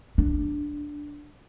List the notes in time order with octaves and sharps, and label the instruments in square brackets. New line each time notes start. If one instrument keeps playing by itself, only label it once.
[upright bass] D4